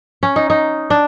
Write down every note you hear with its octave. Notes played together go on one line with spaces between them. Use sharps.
C#4
D#4
D#4
D4